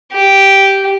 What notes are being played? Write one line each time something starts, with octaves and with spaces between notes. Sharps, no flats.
G4